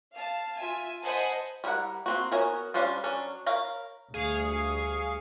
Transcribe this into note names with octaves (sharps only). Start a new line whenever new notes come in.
F5 A5
F4 E5 G#5
C5 D#5 F#5 G#5 A5 B5
G3 C4 E4 A#4 F#5
A#3 C4 F#4
B3 F#4 A#4 C#5 G#5
G3 C#4 D4 C5 F5
F#3 C#4 D4
A#4 C#5 F5 A#5 B5
D2 G3 G#4 F5 C#6